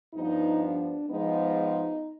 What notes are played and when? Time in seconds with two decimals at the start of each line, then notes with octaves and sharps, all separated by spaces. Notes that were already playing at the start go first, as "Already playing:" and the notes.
0.14 G2 F3 B3 D#4
0.61 D4
1.09 G#2 F3 G#3 B3 D#4